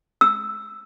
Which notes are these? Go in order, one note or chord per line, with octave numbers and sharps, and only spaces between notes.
E6